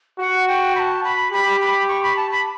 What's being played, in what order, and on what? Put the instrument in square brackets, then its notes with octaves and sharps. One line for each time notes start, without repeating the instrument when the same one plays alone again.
[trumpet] F#4 [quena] F#5
[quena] G5
B5
A5
B5
[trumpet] G4 [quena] B5
[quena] B5
C#6
B5
A5
B5